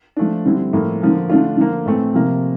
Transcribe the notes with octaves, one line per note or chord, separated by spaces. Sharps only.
F3 A3 D4
D3 G3 C4 E4
A2 F3 A#3
D3 F3 A#3
D3 A3 D4 F4
D3 F3 A#3
A2 E3 A3 C4
C3 F3 A#3